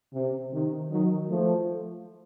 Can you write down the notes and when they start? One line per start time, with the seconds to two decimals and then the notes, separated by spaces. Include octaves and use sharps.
0.14 C3
0.51 C3 D#3
0.90 D#3 F#3
1.29 F3 A3